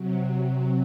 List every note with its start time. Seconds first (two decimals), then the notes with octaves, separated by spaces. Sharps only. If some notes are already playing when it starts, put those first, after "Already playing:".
Already playing: C3 F#3